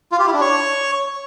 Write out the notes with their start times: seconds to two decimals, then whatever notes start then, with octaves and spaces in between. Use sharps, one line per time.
0.12 F4
0.19 G4
0.26 E4
0.34 D4
0.41 C#5